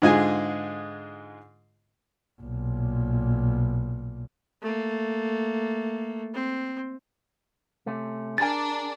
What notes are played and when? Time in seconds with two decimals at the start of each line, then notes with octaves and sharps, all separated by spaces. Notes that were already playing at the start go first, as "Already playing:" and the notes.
0.02 G#2 D3 G#3 F4 G#4 G#5
2.41 B1 A#2
4.62 A3 A#3
6.34 C4
7.86 C3 A3 C#4
8.38 D4 G#4 A#4 G#5 A6